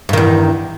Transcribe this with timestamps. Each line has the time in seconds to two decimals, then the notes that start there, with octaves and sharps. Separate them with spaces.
0.09 G2
0.13 D#3
0.17 E2